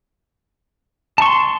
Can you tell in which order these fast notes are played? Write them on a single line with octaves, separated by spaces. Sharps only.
A5 C#6 C6